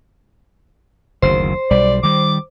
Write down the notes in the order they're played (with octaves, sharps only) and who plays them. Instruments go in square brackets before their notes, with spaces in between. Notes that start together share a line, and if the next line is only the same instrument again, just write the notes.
[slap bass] F#1 D2 D#3 [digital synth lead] C5
[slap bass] B1 G3 [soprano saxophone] D5
[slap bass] D#3 G3 [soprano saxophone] D6